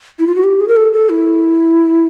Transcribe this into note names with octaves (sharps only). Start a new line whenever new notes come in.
E4
F4
F#4
G4
G#4
A#4
A4
A4
E4